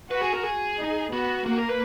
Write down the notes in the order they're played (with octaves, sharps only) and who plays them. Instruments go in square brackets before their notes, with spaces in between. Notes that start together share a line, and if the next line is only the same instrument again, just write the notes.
[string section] F#4 [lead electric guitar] B4
[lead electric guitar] G#4
A#4
G#4
[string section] D#4
[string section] B3 [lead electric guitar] F#4
[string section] A#3 [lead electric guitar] F#4
[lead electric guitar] A#4
B4